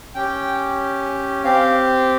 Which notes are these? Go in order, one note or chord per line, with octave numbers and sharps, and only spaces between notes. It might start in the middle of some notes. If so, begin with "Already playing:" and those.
C#4 G4 G5
C4 G4 F5